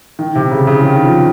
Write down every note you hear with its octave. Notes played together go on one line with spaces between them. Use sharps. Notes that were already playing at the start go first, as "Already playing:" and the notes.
D#3
C3
C#3
C#3
D#3
F3